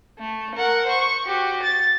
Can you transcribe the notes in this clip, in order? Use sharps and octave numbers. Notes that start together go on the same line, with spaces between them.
A3
A#4 F#5
C5 C#6
F#4 G4
A6